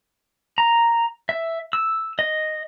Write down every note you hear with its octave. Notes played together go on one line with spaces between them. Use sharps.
A#5
E5
E6
D#5